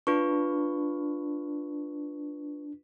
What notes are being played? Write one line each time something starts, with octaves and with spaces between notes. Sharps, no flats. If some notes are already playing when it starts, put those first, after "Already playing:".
D4 F4 B4 C#6